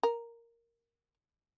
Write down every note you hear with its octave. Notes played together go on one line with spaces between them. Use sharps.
A#4